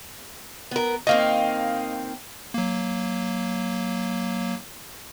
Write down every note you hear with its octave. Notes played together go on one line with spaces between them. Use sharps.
B3 A#4
D#3 A#3 C4 D#5 F5
F#3 A#3